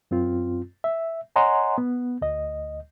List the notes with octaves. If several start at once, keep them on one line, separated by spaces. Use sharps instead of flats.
F#2 C4 F4
E5
C#5 D#5 F#5 G#5 A#5 C6
B3
D2 D#5